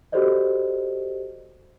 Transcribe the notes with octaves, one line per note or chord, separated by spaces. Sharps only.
F#4 G4 A4 C5 D5 D#5